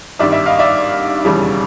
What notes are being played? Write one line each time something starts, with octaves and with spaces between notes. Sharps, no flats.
G#1 G2 D#3 G3 D5 E5
D5 E5
D#5 F5
D5 E5
E1 D#2 C#3 E3 G3